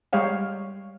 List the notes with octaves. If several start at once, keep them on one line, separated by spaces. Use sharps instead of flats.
G3 G#3 G4 C#5 F5 G5